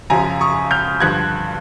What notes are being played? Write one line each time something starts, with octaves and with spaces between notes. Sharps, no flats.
F#2 C#3 F3 G#5 A#5
C#6 D#6
F6 G6
G2 D3 F3 F#6 G#6